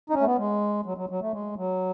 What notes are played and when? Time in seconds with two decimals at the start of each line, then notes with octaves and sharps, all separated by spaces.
0.10 D#4
0.14 C#4
0.21 A3
0.26 B3
0.38 G#3
0.86 F#3
0.97 F#3
1.09 F#3
1.22 A3
1.33 G#3
1.57 F#3